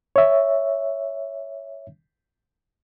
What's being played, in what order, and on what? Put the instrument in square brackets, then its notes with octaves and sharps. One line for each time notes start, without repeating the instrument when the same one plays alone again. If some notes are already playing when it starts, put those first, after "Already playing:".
[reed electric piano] C#5 E5